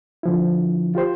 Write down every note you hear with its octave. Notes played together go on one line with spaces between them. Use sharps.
D3 F3 E4
F4 G4 C5 C6